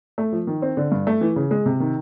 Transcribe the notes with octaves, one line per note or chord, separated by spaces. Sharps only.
A3
F3
D#3
C4
D3
G2
A3
E3
C#3
G#3
C3
D#3